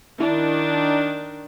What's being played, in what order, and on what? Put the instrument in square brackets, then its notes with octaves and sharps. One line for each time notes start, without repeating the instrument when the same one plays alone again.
[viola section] D#3 D4 [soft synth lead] E4